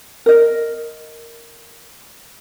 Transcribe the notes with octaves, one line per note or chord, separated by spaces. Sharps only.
A#4 D#5